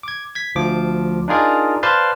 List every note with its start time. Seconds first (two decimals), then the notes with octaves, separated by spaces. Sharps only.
0.03 D6 G#6
0.35 G#6 B6
0.55 D2 F3 D6
1.28 D4 D#4 F4 G#4 A#4 D5
1.83 B4 C5 D5 F5 A5 C6